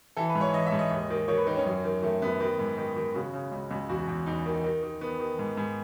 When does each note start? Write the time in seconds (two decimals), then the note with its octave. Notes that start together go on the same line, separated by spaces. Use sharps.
0.17 E3 A4
0.29 B4
0.35 G#2
0.41 C#5
0.54 E3 D#5
0.67 E5
0.72 G#2
0.79 D#5
0.91 D#2
1.10 D#3
1.28 D#3 C#5
1.37 B4
1.47 D#3 D#4
1.56 C#4
1.66 F#2
1.84 D#3
2.02 D#3 A3
2.22 F#2 B3
2.40 D#3
2.59 G#2
2.78 D#3
2.96 D#3
3.14 C#3 F#4
3.33 C#3
3.52 C#2
3.71 C#2
3.89 E2 F#4
4.08 E2
4.26 E2 D#4
4.46 D#3
4.64 D#3
4.83 D#3
5.01 D#3 B3
5.20 D#3
5.39 G#2
5.57 G#2